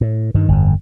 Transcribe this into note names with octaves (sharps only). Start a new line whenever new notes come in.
A2
G2 D#3
G1 F2